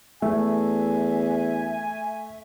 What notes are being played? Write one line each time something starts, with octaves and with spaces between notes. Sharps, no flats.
E2 A3 E5 G#5